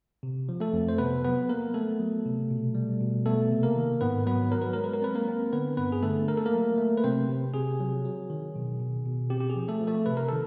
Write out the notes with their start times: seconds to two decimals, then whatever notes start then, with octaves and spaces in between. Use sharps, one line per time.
0.23 C3
0.49 F3
0.60 A3 A4
0.73 F2
0.88 C5
0.98 C3 B3 B4
1.25 F#3 B3 B4
1.49 A#3 A#4
1.74 A3 B3 A4
2.00 F#3
2.25 C3
2.51 B2
2.75 G3
3.01 B2
3.26 A3 B3 A4
3.51 C3
3.63 A#3 A#4
3.76 D#3
4.01 G#2 B3 B4
4.26 F#3 B3 B4
4.51 F#3 A#4
4.62 B4
4.73 G#3 A#4
4.84 B4
4.93 A#4
5.02 C4 B4
5.15 A#3 A#4
5.28 C4
5.53 D3 B3 B4
5.77 G2 B3 B4
5.92 G#4
6.03 D3 A3 A4
6.28 A3 A#4
6.37 A4
6.46 A#3 A#4
6.54 F#3
6.78 A3
6.97 B4
7.04 C3 C4 C5
7.28 C3
7.54 C3 G#4
7.80 F#3
8.05 F#3
8.30 D#3
8.56 B2
8.80 B2
9.05 B2
9.30 C4 G4
9.40 G4
9.49 G#4
9.56 F3
9.68 A3 A4
9.81 F3
9.87 A3 A4
10.06 C3 B4
10.17 A#4
10.29 D#3 A4